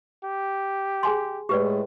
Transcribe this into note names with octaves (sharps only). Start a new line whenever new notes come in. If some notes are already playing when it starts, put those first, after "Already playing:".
G4
G#4 G#5 C6
A2 G#3 G4 B4 D5